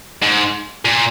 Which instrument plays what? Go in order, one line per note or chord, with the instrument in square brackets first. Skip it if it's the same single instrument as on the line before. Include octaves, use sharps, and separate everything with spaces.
[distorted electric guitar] G#2
A#2